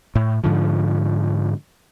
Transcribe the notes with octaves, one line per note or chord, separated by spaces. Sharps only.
A2
G#2 D3 F3